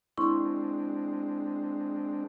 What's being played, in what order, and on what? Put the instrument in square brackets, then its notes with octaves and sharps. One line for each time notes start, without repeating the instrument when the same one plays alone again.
[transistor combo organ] G#3 C4 D4 [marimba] E4 C6 C#6